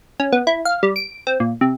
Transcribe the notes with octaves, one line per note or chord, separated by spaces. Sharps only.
C#4
B3
E4
F5
G3
D7
C4
A#2
C3